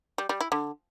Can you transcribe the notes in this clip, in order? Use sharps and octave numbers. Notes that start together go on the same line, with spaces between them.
G3
G3
E4
D3